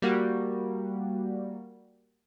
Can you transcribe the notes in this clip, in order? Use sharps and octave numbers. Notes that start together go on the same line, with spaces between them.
G3 A#3 F#4